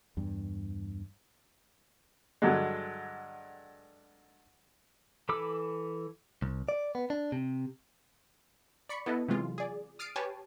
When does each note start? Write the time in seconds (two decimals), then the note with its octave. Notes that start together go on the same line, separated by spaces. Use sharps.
0.17 E2 G2
2.42 G2 D3 F#3 G#3
5.29 E3 A4 B5 D6 E6
6.42 C2
6.69 D5
6.95 B3
7.10 D4
7.32 C3
8.89 D5 B5 C#6 C#7
9.06 B3 E4 A4 B4 D#5
9.28 C3 E3 F#3 G#3 F4
9.58 G#4 D5
9.99 D#6 F6 A6 C7 D7 D#7
10.16 G4 B4 C#5 G#5 A5